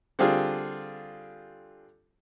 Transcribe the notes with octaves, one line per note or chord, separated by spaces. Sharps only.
D3 G3 C4 D4 F4 G#4